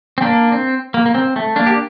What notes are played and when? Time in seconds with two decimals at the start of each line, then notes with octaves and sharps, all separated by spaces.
0.18 C4
0.22 A#3 D4
0.52 C4
0.94 A#3
1.06 A#3
1.15 C4
1.36 A3
1.56 A#3 D4
1.67 G4